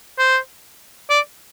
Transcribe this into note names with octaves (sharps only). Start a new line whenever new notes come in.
C5
D5